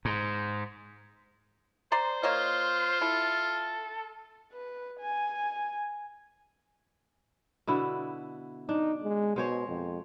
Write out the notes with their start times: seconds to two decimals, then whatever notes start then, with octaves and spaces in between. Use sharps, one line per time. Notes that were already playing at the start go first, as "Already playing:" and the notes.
0.05 G#2
1.92 C5 D5 A#5 C6
2.23 A#3 F4 C#5 D#5
3.01 E4 A4
4.53 B4
5.00 G#5
7.67 B2 D3 E4
8.69 D4 D#4
9.04 G#3
9.36 B2 G#3 C5 C#5
9.68 F2